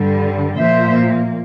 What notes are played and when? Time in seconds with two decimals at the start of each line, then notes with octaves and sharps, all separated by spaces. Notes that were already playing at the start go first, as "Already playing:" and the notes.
Already playing: G2 D3 G3
0.57 A#2 F3 A#3 C5 E5